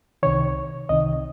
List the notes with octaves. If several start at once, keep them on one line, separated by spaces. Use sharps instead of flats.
C2 C3 D#3 C#5
C2 C3 D#3 D#5